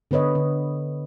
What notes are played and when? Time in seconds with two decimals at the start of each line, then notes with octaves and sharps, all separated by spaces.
0.11 D3 B3 B4 C#5 D#5
0.35 D3